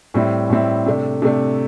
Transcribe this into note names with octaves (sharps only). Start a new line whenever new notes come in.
A2 G3 C4 E4
A2 G3 C4 E4
C3 A3 D4
C3 A3 D4